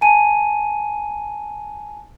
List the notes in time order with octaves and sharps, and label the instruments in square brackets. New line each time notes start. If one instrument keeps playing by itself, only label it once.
[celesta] G#5 A5 D#7